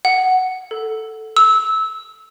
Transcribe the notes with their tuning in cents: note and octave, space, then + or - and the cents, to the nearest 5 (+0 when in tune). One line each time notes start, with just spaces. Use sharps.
F#5 +10
A4 +0
E6 -20